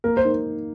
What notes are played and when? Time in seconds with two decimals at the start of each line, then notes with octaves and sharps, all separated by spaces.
0.04 A#3 A#4
0.17 C5
0.25 D#4